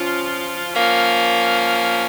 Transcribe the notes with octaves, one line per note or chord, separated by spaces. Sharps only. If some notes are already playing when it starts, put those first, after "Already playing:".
Already playing: F3 C#4 F4
F3 A#3 C#4